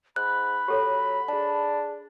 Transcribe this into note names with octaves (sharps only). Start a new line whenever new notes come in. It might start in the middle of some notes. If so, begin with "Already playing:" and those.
G#2 B5 F#6
F#3 G4 A4 C#5
D4 G#4 A5